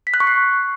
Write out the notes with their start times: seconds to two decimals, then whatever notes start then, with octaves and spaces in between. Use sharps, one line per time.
0.07 B6
0.14 F#6
0.20 C#6
0.27 C7